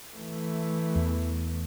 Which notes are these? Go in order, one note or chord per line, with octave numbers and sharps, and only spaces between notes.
E3 A3
E2